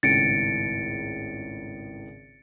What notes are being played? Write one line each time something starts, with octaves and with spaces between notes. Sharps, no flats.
G#1 C#2 A2 A6 C#7 D7